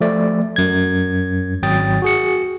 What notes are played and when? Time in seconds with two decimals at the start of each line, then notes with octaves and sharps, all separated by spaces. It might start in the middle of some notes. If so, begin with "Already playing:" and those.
0.01 F3 A3 D5
0.56 F#2 G#6
1.63 G#1 F#3 G5 D#6 A6
2.02 F#4 G#4 C#7